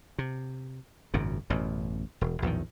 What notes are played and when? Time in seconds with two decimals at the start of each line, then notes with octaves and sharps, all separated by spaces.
0.18 C3
1.14 G#1 F#2 A#2 C#3
1.50 A1 F#2 B2
2.21 E1
2.42 A#1 E2 A2 D#3